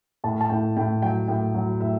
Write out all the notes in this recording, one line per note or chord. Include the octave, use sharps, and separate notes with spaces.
A2 A5
A5
A2 G5
A2 G5
F#3 G5
A2 G5
F#3
A2 E5